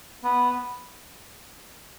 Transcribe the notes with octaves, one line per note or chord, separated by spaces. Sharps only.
B3